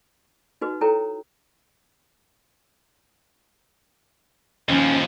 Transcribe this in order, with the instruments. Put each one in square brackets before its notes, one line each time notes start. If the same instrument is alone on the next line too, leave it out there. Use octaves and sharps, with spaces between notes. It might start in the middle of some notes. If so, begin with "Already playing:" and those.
[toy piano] D#4 F#4 B4
E4 A4 C#5 G5 A#5
[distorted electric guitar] D#2 F3 [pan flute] C#4